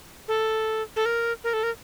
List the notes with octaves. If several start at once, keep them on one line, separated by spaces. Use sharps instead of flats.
A4
A4
A#4
A#4
A4
A#4